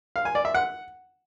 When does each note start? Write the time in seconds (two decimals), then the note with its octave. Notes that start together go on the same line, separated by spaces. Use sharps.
0.16 F5
0.25 G#5
0.35 D5
0.45 E5
0.55 F#5